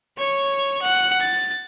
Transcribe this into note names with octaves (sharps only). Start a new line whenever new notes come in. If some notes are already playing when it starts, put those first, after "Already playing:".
C#5 C#6
F#5
A6